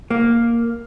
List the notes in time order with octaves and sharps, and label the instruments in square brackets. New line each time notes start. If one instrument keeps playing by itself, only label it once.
[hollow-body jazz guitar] A#3